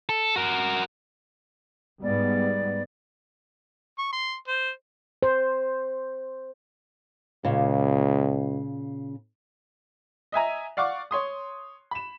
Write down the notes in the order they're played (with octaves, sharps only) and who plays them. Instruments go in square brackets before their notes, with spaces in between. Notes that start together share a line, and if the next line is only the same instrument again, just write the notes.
[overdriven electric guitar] A4
F#4 A#4
[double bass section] G#2 G3 B3 [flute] D5
[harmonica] C#6
C6
C5
[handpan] C5
[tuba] C#2 [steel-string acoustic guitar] A#2 C#3
[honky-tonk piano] D#5 E5 G#5 A#5
D5 F5 F#5 C#6 D6
C#5 C6 D#6
B5 E7